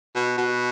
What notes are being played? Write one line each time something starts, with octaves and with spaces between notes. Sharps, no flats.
B2
B2